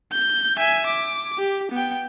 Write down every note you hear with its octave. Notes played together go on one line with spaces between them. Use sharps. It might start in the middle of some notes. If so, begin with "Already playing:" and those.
G6
E5 G#5
D6
G4
B3 G5